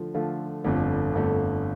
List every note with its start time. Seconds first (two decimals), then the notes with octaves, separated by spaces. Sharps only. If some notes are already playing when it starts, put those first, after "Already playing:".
Already playing: D3 F3 A3 F4
0.14 D3 F3 A3 F4
0.64 G1 F2 D3 A3
1.13 G1 F2 D3 A3